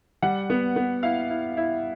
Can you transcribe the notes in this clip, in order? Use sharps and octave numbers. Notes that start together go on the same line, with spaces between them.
G3 F#5
B3
B3
E4 F5
E4
E4